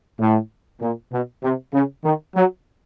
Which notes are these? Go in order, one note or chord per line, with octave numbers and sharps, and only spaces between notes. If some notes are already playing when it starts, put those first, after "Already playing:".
A2
A#2
B2
C3
C#3
D#3
F#3